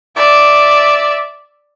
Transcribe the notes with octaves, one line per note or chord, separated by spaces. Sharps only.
D5 E5